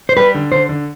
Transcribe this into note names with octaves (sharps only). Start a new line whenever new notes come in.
C5
G3 B4
D3
D3 C5
D3